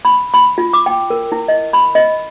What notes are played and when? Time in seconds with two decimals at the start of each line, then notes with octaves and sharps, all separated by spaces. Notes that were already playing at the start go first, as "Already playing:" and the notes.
0.05 B5
0.34 B5
0.58 F4
0.73 D6
0.86 G5
1.10 A#4
1.32 E4
1.48 D#5
1.73 B5
1.95 D#5